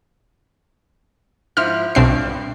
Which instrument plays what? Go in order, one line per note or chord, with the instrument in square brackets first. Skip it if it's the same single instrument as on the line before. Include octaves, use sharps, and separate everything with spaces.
[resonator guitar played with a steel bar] G#2 F3 E4 [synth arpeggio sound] F6
[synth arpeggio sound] B1 C4 C7 [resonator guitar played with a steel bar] G2